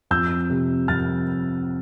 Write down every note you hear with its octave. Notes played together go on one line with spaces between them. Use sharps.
F2 E6 G6
C3
F2 F6 A6